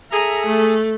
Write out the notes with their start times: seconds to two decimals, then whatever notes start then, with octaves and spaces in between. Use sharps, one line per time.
0.11 G#4 A4 E5 A#5
0.45 A3